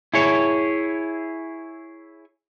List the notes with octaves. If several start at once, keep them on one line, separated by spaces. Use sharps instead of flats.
E4 G#4 C#5